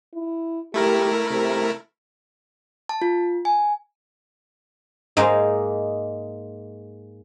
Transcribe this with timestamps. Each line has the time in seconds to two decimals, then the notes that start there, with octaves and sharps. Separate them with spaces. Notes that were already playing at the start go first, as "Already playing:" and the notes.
0.14 E4
0.74 A3 E4 G4 A#4
1.31 C3
2.89 A5
3.02 F4
3.45 G#5
5.17 G#2 G#3 A#3 D#4